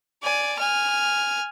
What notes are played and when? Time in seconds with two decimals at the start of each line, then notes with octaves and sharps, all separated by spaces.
0.23 D5 G#5
0.59 G#5 F6